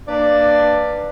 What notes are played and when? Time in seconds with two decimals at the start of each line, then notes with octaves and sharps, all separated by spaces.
0.08 A#3 D4 B4 D5